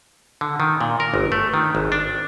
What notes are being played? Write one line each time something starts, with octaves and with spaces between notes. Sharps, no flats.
D3
D#3
A#2
A#4
G1
A3
D#3
G#1
D4